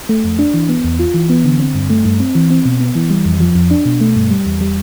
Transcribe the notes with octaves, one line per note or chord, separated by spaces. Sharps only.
A3
F2
D4
E3
B3
E2
F4
E3
B3
D3
C4
G2
A3
G2
C4
E3
C4
B2
B3
E3
G3
F2
F3
F2
D4
B2
A3
G2
G3
E2
G3